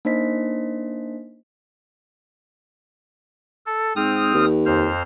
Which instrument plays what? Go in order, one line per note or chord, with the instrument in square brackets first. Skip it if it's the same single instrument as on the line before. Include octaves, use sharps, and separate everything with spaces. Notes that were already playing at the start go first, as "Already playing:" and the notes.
[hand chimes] A#3 D4 D#4 C5 D#5 B6
[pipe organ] A4
[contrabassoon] G#2 [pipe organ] C4 D#6 F6
[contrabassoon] D#2
[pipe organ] F2 C5 F6